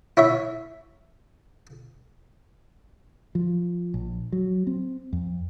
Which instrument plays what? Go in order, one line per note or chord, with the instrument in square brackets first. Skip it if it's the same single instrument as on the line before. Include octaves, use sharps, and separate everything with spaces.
[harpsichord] E4 C#5 E5
[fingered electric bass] F3
A#1
F#3
C4
F2